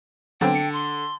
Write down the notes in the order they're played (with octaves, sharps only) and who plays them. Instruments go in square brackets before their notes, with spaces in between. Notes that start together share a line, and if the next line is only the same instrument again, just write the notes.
[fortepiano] D3 [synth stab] F#3 B3 C4 [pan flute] G5
[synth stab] C#7
[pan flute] C6